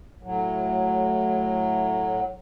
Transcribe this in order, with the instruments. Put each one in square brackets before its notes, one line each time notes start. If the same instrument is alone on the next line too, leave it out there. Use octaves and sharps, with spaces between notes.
[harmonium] A2 F#3